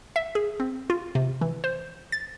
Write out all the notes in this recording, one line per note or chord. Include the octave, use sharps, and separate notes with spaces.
E5
G#4
C4
F4
C3
E3
C5
A6